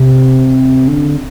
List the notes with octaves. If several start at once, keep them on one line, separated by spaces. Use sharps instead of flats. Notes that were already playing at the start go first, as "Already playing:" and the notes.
Already playing: C3
D3